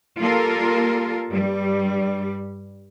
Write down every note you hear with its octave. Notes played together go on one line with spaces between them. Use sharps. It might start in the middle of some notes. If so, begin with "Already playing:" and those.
G3 A#3 F4 A4 A#4
G2 G3